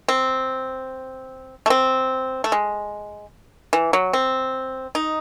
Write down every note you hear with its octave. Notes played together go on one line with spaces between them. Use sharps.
C4
A3
C4
A3
G#3
E3
F#3
C4
D#4